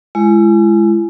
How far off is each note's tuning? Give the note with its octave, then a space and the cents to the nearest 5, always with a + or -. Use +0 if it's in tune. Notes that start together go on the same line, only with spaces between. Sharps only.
G#3 +15 E4 +40